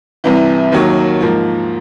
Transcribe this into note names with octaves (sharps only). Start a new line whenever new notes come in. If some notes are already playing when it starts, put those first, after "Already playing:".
C2 C3 E3
D#2 D#3 F#3 A#3
G#2 F3 A#3